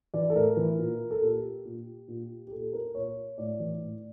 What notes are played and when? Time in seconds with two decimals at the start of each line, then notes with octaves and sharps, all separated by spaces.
0.14 E3 D5
0.30 A4
0.35 A2 A#4
0.57 E3
0.79 A#2
1.11 A4
1.22 A#2 G4
1.65 A#2
2.08 A#2
2.47 G4
2.52 A#2 A4
2.73 A#4
2.95 A#2 C#5
3.38 A2 D5
3.60 E3
3.82 A2